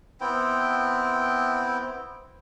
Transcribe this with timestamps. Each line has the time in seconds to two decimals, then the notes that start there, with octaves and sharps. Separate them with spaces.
0.21 B3 C4 E4 G5